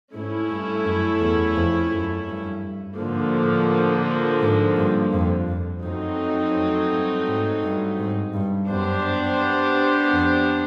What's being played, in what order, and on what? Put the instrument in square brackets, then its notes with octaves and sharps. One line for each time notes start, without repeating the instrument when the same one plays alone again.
[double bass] G#2 [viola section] A3 C#4 E4
[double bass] G2
F#2
E2
F2
F#2
G2
[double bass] G#2 [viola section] D3 F3 A#3
[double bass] A2
G#2
G2
F2
F2
[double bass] F#2 [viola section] F#3 A3 C4 D#4
[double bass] F2
G2
G#2
G2
G#2
G2
[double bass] F#2 [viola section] B3 D4 G4 C5
[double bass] F2